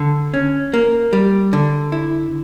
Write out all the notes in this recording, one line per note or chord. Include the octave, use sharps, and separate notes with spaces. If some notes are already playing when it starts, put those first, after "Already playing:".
Already playing: D3
C#4
A#3
G3
D3
E4